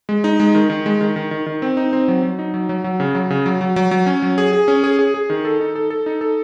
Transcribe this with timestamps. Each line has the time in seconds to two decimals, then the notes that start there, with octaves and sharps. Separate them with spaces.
0.09 G#3
0.24 D#4
0.40 G#3
0.55 D#3
0.70 D#3
0.86 G#3
1.01 D#3
1.16 D#3
1.31 D#3
1.46 D#3
1.62 C4
1.77 D#4
1.93 C4
2.08 F#3
2.23 F#3
2.39 D#4
2.54 F#3
2.69 F#3
2.84 F#3
3.00 C#3
3.15 F#3
3.30 C#3
3.46 F#3
3.61 F#3
3.76 F#3
3.91 F#3
4.06 C#4
4.22 F#3
4.38 G#4
4.53 G#4
4.68 C#4
4.84 G#4
4.99 G#4
5.14 G#4
5.30 D#3
5.45 A4
5.60 D#4
5.76 A4
5.90 A4
6.06 D#4
6.21 A4